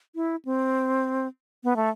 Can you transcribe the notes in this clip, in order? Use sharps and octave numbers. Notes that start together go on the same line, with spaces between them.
E4
C4
B3
A3